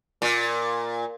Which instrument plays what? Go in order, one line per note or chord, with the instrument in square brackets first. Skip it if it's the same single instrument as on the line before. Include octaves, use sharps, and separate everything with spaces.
[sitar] A#2